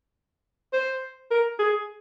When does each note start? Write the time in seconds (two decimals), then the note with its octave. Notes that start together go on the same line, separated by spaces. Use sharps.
0.73 C5
1.31 A#4
1.59 G#4